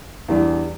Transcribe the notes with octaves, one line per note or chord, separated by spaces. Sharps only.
E2 E3 G3 D4